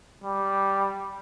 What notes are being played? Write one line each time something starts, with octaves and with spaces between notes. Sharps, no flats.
G3